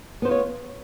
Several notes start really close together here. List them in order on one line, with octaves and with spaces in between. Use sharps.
B3 C5 F4 C#5